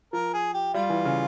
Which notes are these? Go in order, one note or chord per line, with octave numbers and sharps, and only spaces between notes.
F3 A#4
G#4
G4
G3 F4
E3
C#3